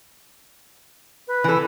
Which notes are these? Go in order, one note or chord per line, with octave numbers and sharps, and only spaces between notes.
B4
E3 A4